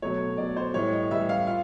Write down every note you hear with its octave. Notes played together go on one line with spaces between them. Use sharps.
B2 F#3 A3 C#5
B2 F#3 A3 D5
C5
A2 E3 G3 C#5
D#5
A2 E3 G3 E5
F5
F4 F5